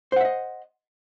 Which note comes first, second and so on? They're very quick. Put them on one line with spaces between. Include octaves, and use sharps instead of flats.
C5 F#5 E5 D#5